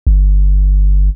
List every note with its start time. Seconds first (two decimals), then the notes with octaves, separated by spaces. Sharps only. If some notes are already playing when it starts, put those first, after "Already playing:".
0.07 G1